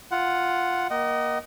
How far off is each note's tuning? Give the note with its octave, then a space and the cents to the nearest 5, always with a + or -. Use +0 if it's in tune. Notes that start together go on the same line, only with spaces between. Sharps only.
F4 +0 F#5 +0
A#3 +20 D#5 +0 F#5 +45